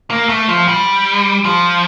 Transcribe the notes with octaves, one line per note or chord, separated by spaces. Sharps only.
A#3
A3
F3
G3
F3